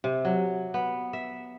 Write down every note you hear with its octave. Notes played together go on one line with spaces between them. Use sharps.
C3
F#3
B3
E5